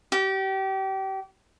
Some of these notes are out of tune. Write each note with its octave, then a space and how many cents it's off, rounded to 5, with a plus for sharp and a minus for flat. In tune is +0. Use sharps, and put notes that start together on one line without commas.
G4 -30